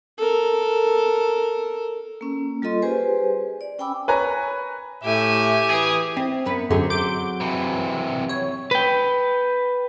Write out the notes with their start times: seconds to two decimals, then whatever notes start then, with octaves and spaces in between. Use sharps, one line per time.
0.17 A4 A#4
2.21 A#3 C#4
2.62 G3 F4 A4 D#5 C6
2.82 G4 G#4 B4 C5 G#5
3.61 D5
3.79 C#4 G5 G#5 B5 D6 E6
4.08 B4 C#5 G#5 A#5
5.04 A2 G4 E5 G#5
5.70 E3 G#4
6.17 C4 E4
6.45 F#2 B3 B4
6.70 F#2 D3 F#3 C4 G#4
6.90 D6 G6 D7
7.41 C3 E3
8.29 C#5
8.71 B4 G5